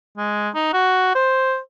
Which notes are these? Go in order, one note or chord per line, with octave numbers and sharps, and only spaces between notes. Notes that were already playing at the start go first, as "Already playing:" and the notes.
G#3
D#4
F#4
C5